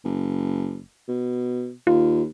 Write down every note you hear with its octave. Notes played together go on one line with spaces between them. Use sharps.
F#1
B2
D#2 F4